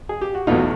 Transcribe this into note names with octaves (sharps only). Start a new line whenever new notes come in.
G#4
G4
F#4
E2 B2 F#3 A3 D#4 F4